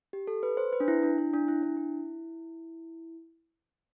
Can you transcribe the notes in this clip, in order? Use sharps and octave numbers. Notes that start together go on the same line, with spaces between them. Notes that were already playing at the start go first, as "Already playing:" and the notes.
G4
A4
B4
C5
B4
D4
E4
D4
E4
D4
E4
D4
E4